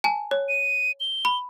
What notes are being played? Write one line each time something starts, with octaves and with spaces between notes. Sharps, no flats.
G#5 A5
C#5
D#7
G7
B5